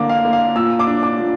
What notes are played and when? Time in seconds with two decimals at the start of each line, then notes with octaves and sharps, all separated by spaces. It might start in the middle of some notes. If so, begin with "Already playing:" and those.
Already playing: D3 A#3 D4 D6
0.09 F5
0.25 A#3
0.33 F5
0.56 A#2 E6
0.79 D6
0.87 D4
1.03 D6
1.19 A#2